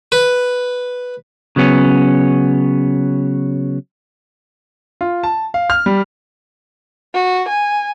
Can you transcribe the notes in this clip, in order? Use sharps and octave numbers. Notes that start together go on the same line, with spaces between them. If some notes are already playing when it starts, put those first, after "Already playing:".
B4
C#3 F#3 B3 C#4
F4
A5
F5
F6
G3
F#4
G#5